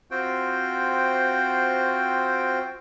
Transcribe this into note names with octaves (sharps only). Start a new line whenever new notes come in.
C4 F4 F#4 C5 G5